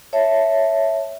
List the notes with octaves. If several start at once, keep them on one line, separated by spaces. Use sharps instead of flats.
C#5 E5 A5